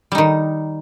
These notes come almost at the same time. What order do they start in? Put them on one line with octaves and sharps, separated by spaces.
G3 D#4 D#3